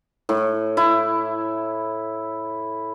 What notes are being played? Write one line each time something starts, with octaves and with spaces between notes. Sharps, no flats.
A2
E4